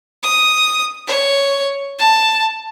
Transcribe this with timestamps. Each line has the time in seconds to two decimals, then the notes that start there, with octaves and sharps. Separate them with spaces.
0.23 D#6
1.07 C#5
1.99 A5